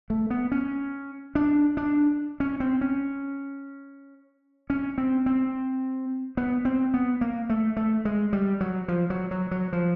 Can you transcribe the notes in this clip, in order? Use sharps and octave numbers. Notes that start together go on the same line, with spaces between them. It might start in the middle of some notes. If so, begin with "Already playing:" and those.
A3
B3
C#4
D4
D4
C#4
C4
C#4
C#4
C4
C4
B3
C4
B3
A#3
A3
A3
G#3
G3
F#3
F3
F#3
F#3
F#3
F3